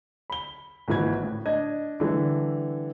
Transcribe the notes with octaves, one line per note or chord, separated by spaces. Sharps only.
B5 G7
G#1 A#2 E3 B4 G#6
A2
D4 D#5 G#6
D3 E3 G3 A3